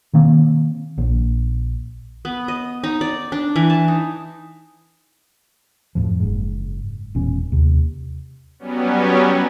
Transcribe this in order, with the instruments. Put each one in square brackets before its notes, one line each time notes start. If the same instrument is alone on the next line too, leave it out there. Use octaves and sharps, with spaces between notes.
[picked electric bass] B2 D#3 A#3 C4
A#1
[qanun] B3
D#5
D#4
D5
D4
E3
A5
D#4
[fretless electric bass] F2 A2 F3
F#1 G#2
E1 E2 A#2 C#4
D#2 C3
[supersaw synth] F#3 G3 B3 C#4